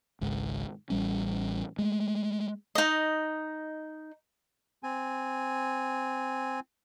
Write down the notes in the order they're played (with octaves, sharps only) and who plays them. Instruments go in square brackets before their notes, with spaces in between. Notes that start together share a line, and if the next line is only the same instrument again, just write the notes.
[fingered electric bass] G#1 C#2 G#2
A1 G3 C#4
G#3 A3
[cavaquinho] D#4 D#5
[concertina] C4 G#5